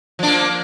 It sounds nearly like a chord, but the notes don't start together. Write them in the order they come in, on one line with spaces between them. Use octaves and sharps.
F3 D4 A#3